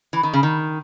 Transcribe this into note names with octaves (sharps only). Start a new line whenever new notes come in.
E3
D#3
C#3
D#3